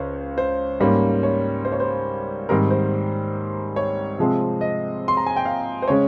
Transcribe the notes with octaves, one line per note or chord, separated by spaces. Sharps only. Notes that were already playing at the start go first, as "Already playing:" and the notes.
Already playing: C#2 C5 C#5
C5
G#2 G3 A#3 C#4
C#5
C5
C#5
C5
G#2 D#3 G3 C4 A#4
C5
C#5
C3 F3 G#3 C4
D#5
C6
A#5
G#5
G5
F5
C5
C#3 G#3 C#4 C#5